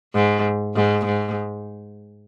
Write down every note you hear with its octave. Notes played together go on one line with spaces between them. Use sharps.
G#2
G#2
G#2